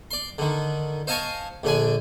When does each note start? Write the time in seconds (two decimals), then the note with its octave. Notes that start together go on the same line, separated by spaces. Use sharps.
0.11 D5 C6
0.38 D3 D#3
1.07 C5 D#5 F5 G#5 A5 C#6
1.63 A#1 D3 D4 G#5